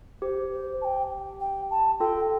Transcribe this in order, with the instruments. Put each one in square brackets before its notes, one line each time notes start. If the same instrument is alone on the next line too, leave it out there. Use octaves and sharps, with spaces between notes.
[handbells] G4 [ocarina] C5
[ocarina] C5
A5
G5
G5
A5
[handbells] F4 A4 [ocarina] G5